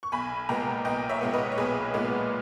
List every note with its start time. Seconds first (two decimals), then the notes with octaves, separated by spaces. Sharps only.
0.03 C#6
0.12 B1 G#5 B5
0.49 A#2 G#3 B3 G5 A#5
0.85 B1 D#5 G5
1.09 C#5 E5
1.21 A#2 G#3 B3
1.33 B4 D#5
1.52 C#5
1.58 B1 G#4 B4
1.94 A#2 G#3 B3